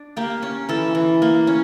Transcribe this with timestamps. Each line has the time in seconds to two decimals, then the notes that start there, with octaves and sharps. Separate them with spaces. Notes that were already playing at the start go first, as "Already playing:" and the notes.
Already playing: D4
0.17 A#3 G4
0.42 C#4
0.69 E3 A4
0.95 E3
1.22 A#3
1.47 C#4